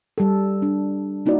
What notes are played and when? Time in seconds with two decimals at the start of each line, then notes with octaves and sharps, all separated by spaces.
0.18 G3 A4
0.62 D4
1.26 A#3 D#4 E4 F#4 D5